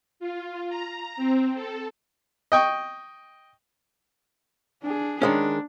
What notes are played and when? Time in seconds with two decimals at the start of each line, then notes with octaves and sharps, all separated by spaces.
0.20 F4
0.69 A#5
1.17 C4
1.55 A4
2.52 D#5 G5 C#6
4.83 D4 G#4
5.22 D#3 G#3 C#4 D4